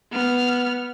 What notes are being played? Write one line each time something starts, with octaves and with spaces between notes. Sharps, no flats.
B3 F6